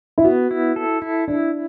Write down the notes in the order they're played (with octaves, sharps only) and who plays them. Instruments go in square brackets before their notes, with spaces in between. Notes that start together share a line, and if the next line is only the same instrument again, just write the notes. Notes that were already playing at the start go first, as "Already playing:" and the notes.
[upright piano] E4
[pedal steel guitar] B3 [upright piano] F#4
[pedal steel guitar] E4
A4
E4
[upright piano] D4 [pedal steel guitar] E4